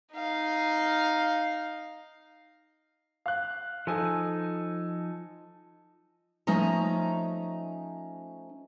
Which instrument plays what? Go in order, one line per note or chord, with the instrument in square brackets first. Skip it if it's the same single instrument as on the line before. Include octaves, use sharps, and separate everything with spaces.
[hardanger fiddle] D#4 F5
[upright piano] F5 F#6
[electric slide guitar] F3 D#4 [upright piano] A4 G#5
[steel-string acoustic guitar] F3 A3 C#4 D#4 A#5